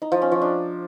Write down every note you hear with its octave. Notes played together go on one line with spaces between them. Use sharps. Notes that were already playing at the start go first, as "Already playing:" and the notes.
D#4
F3
C#4
F3
D4